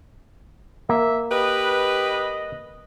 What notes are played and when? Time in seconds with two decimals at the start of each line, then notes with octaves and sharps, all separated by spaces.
0.89 A#3 E5
1.32 G4 B4 D#5